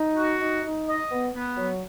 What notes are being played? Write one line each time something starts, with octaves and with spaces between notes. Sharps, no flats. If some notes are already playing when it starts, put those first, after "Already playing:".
Already playing: D#4
F#4
D#4
D#4
D#5
B3
B3
F#3